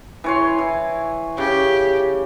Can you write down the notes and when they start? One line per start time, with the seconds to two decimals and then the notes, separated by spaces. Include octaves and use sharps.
0.24 E3 C#5 C6
0.58 E3
1.38 C#3 G4